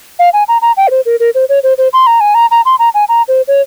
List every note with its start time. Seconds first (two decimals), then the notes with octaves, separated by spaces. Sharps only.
0.19 F5
0.33 G#5
0.48 A#5
0.62 A#5
0.77 G5
0.88 A#4
0.91 C5
1.06 A#4
1.20 A#4
1.35 C5
1.49 C#5
1.63 C5
1.78 C5
1.93 C6
2.07 A#5
2.21 G#5
2.35 A#5
2.51 A#5
2.65 C6
2.79 A#5
2.94 G#5
3.09 A#5
3.28 C5
3.48 C#5